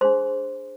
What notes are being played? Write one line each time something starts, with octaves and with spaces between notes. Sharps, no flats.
D4 G#4 C5 C6